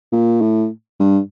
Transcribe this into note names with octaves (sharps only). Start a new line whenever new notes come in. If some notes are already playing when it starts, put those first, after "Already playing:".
A#2
A2
G2